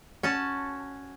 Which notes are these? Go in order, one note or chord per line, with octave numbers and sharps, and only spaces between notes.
C#4 F#4 A5